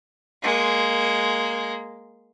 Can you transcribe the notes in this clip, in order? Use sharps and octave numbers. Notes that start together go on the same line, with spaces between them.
G#3 A#3